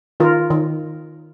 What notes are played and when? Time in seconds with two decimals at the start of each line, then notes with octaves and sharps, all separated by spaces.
0.20 D#3 F4 A#4
0.51 D#3